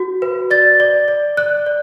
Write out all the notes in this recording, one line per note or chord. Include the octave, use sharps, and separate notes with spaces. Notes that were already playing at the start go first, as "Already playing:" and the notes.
Already playing: F#4
B4
D5 A6
D5
D5
D5 F#6
D5